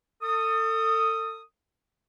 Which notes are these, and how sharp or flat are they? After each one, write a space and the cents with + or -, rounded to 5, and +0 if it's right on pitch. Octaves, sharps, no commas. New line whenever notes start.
A4 +30 D#6 +0